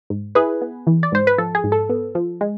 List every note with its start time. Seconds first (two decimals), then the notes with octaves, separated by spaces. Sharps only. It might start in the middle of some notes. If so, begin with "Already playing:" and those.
0.10 G#2
0.35 E4 G#4 B4
0.62 B3
0.87 E3
1.03 D5
1.12 G#2 C5
1.27 B4
1.38 F3 A4
1.55 G#4
1.64 G#2
1.72 A4
1.89 B3
2.15 F3
2.41 G#3